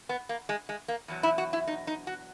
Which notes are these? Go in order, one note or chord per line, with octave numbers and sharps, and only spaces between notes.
B3
A#3
G#3
G#3
A#3
E2 B2 F#3
E4
F#4
E4
D#4
D#4
F#4